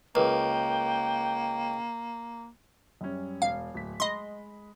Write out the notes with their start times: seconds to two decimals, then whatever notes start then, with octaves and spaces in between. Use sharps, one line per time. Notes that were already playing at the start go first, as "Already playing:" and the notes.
0.15 C#2 A#3 G#4 A#4 B4 G5
3.01 F#2 G3 C#4
3.42 E1 F5
3.74 D1 B6
4.00 G#3 D#5 B5 C6